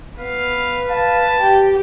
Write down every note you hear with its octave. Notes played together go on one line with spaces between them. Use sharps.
B3 B4 F5
F5 A5
G4 G5